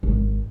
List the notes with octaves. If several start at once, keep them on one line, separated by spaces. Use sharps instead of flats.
G#1